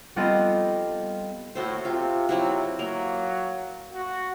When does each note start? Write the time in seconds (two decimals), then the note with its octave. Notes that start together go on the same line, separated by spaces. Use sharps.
0.16 G3 B3 C4 F4 A4 D#5
1.55 A2 F#4 A4 C5
1.85 C3 F4
2.29 C3 F#3 E4 F#4
2.79 F#3 A#3
3.94 F#4